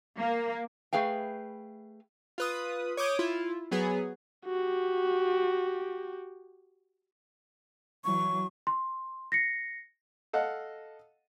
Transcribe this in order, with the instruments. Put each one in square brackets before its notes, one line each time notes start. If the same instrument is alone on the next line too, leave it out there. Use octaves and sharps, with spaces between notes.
[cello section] A#3
[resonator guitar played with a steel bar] A3 G#4 B4 F5 G5
[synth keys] F4 B4 D#6
C#5 D6 D#6 G6
E4 F4
F#3 B3 G#4
[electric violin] F#4 G4
[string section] E3 F#3 [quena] C#6
[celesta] C6
A#6 C7 C#7
[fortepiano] A4 D#5 F5 F#5